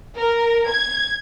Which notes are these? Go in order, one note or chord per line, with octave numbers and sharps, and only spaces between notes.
A#4
G#6